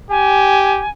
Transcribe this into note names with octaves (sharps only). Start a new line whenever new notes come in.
G4 G#5